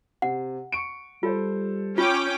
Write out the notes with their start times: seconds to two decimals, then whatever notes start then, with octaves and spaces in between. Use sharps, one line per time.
0.22 C3 F#5
0.72 C#6 C#7 D7
1.23 G3 F4 A4 C5
1.98 C#4 F4 G5 D6